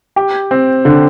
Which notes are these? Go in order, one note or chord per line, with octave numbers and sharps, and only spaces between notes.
G4
C4
D3